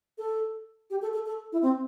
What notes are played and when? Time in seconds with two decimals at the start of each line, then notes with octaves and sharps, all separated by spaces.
0.18 A4
0.90 G4
1.02 A4
1.13 A4
1.26 A4
1.52 E4
1.62 C4